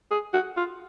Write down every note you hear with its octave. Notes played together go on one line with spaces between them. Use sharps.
G#4
F#4
F4